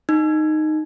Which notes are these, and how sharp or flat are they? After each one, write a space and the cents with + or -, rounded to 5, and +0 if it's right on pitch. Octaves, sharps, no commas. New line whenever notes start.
D#4 -10